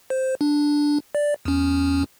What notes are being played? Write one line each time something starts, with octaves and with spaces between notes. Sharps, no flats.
C5
D4
D5
E2 C#4